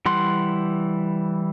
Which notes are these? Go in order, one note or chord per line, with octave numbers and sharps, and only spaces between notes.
E3 G3 F#5 C6